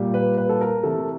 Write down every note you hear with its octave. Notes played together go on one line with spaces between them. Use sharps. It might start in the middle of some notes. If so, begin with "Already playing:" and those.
Already playing: A#2 G3
B4
B4
A4
A#4
C3 E3 A3 A4